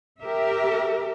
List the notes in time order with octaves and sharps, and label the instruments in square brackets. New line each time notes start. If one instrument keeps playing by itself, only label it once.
[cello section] G4 A#4 E5